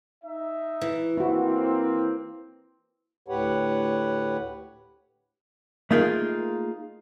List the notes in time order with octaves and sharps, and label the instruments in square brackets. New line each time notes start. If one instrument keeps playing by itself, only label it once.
[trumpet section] D#4 E5
[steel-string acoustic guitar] E3
[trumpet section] A#3 C4 [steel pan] E4 F#4
[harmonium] D2 A2 G4 B4 C#5 F#5
[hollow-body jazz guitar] A3 A#3 D#4 F4 G#4 A#4